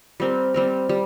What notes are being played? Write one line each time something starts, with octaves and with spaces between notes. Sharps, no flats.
G3 C4 A#4
G3 C4 A#4
G3